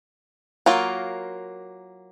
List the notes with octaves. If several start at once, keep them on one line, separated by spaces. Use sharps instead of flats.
F#3 A#3 F4 A#4